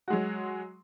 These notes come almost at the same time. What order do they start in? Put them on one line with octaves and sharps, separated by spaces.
F#4 G#3 F#3